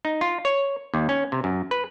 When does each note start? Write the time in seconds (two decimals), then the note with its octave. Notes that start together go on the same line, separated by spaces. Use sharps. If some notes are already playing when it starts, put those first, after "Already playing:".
0.05 D#4
0.21 F4
0.45 C#5
0.94 D#2
1.09 C#4
1.32 C3
1.44 F#2
1.71 B4